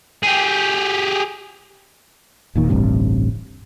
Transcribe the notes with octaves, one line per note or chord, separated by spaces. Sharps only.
G4 G#4
E1 A#2 D#3
D1 A1 G2 C3